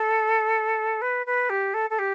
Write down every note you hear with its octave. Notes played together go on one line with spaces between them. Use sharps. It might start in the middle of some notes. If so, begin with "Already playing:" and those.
Already playing: A4
B4
B4
G4
A4
A4
G4